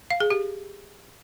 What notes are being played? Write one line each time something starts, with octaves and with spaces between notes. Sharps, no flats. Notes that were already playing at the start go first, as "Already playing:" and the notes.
F5
G#4
G4